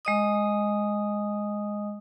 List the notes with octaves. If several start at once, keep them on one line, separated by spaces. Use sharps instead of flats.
G#3 D#5 D#6